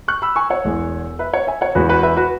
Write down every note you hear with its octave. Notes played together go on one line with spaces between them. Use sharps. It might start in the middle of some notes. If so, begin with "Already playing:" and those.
C#6 F#6
B5 E6
G#5 C#6
C#5 F#5
E1 E2 E3 G#3
B4 E5
C#5 F#5
E5 G#5
C#5 F#5
E2 C#3 E3 G#3 F#4 B4
F#4 B4
B4 E5
F#4 B4